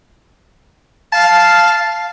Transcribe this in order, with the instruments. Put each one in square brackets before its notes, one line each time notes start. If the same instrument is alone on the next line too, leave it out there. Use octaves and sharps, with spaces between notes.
[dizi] F5 [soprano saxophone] A5